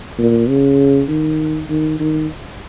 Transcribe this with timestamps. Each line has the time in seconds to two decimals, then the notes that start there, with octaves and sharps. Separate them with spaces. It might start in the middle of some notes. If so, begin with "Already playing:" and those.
0.19 A#2
0.49 C#3
1.09 D#3
1.69 D#3
2.00 D#3